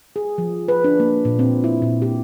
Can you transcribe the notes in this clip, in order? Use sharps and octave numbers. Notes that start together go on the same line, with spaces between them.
G#4
F3
B4
D4
A#3
A#2
C4
E4
A#2
G4